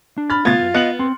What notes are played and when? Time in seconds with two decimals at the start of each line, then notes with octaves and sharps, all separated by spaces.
0.18 D4
0.30 B5 F6 A6
0.45 A#2 C#3 A3 B3 F4 G#6 A6
0.58 B1 F#2
0.74 B3 B4 D#5 F#6 C#7 F#7
0.99 C4 C6